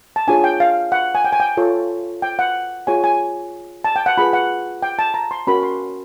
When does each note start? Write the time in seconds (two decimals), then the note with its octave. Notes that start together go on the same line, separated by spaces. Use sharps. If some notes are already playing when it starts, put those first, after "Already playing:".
0.16 A5
0.27 D4 F4 G#4 C#5 G#5
0.44 G5
0.60 F5
0.92 F#5
1.15 G#5
1.25 G5
1.33 G#5
1.40 G5
1.57 F4 A4 C#5
2.22 G5
2.39 F#5
2.87 F4 G#4 C#5 G#5
3.04 G#5
3.84 A5
3.96 G5
4.06 F#5
4.18 F4 G#4 B4 B5
4.33 F#5
4.83 G5
4.99 A5
5.14 A#5
5.31 C6
5.47 C#4 F#4 A#4 B5
5.63 C6